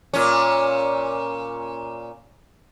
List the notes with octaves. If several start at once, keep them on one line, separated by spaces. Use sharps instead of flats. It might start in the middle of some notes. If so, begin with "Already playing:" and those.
A#2 C#4